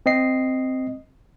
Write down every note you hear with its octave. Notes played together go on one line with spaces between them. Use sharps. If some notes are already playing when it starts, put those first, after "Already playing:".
C4 D#5 C7